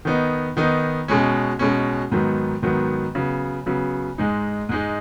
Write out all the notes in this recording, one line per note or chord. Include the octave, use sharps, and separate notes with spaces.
D#3 B3 D#4
D#3 B3 D#4
B2 G#3 C#4
B2 G#3 C#4
G#2 D#3 F#3 B3
G#2 D#3 F#3 B3
C#3 F#3 B3
C#3 F#3 B3
G#2 G#3 D#4
G#2 G#3 D#4